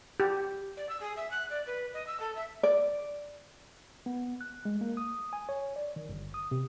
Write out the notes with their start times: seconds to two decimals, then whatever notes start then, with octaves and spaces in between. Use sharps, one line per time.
0.20 G4
0.77 D5
0.89 E6
1.00 G#4
1.16 E5
1.31 F#6
1.49 D5
1.66 B4
1.93 D#5
2.07 E6
2.20 A4
2.35 E5
2.63 D5
4.06 B3
4.41 F#6
4.65 G#3
4.81 A#3
4.97 D#6
5.33 G#5
5.49 C#5
5.76 D5
5.96 D#3
6.09 G1
6.34 D#6
6.51 C3